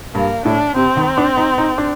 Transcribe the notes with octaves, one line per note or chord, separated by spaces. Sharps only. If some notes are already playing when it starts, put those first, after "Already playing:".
G2 A#3
A2 D4
C3 C4
D#3
D4
D#4
D#4
D4